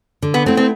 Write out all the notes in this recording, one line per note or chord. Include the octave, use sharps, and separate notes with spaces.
D3
B3
A3 C4 E4
C4